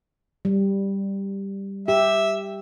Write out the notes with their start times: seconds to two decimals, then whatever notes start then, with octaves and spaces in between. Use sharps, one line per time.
0.45 G3
1.88 G4 E5